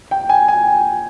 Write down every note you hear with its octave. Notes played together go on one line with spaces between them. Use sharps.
G5
G#5
G#5